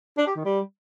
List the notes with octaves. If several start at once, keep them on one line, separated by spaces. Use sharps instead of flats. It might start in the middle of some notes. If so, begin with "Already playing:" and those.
D4
G4
D#3
G3